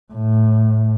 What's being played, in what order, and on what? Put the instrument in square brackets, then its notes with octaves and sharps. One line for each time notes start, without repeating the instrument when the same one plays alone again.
[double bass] A2